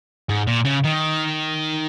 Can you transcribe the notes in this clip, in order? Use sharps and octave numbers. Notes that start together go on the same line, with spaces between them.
G#2
A#2
C#3
D#3